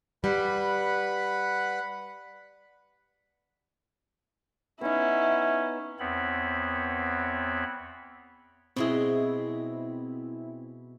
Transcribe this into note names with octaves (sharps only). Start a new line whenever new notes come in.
G3 B4 F#5 B5
B3 C#4 D#4 E4
E2 B3 C4 C#5 B5
B2 G#3 C4 E4 G#4